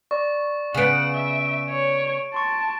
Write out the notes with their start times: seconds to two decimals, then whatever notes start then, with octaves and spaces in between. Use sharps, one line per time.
0.11 D5 C#6
0.74 C#3 B3 F#5 D7 E7
1.15 E5
1.70 C#5
2.34 A5 C6 C#6